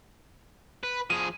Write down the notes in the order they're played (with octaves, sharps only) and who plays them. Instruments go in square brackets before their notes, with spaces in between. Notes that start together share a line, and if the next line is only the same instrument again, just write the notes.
[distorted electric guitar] B4
[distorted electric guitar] F3 G#4 [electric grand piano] D#7